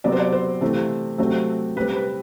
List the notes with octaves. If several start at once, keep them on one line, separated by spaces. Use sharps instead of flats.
C3 F#3 B3 D5
C5
D5
C5
C3 E3 A3 C4
C3 F#3 A3 C4
C3 G3 C4 B4
B4